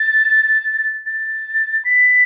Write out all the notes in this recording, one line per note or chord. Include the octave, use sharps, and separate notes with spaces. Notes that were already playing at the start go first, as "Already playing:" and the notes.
Already playing: A6
A6
B6